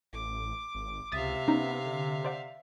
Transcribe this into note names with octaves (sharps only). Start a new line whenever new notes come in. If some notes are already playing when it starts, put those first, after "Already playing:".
A1 D6
G#1
C#2 C3 E5 F5 D#6 A6
B3 C#4 D#4 A#5
D3
C5 D5 F#5